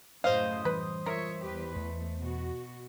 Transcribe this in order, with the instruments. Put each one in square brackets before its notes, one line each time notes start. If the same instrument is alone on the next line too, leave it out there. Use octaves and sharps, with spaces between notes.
[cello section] F#2 A2 C#3 [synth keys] C5 D#5 D#6 [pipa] F5
[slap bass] E3 G3 [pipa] B4
[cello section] F4 C#5 E5 [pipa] A#4
[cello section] E2 G4 B4
[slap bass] E2 [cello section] A3
[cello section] B2 F#4